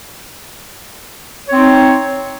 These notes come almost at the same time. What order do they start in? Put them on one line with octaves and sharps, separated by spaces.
C#5 C4 D#4